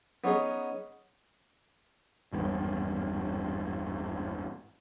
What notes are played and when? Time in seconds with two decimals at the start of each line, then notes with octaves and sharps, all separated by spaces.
0.24 B3 C#4 D#4 G#4
2.32 G#1 E2 G2